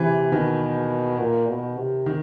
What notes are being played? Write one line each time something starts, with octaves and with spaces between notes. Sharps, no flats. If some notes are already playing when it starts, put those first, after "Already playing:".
Already playing: C3 E3
B2 D#3
A#2
B2
C3
D#3